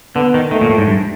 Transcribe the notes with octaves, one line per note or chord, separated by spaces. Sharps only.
D3 B3
D#3
D#3 A3
A#2
A2
G#2
G2